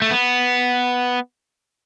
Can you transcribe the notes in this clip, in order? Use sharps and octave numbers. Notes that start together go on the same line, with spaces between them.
A3
B3